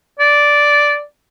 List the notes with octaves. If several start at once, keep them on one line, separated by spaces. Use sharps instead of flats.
D5